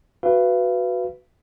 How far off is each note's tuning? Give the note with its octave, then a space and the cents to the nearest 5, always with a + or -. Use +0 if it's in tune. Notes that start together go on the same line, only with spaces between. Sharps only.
F#4 +0 B4 +5 F5 -40